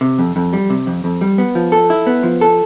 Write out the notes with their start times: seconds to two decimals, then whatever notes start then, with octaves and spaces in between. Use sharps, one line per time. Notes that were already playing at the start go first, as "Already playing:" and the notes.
0.01 C3
0.19 F2
0.36 F2
0.53 G3
0.70 C3
0.87 F2
1.04 F2
1.21 G3
1.38 B3
1.55 F3
1.72 A4
1.90 E4
2.07 B3
2.23 F3
2.41 A4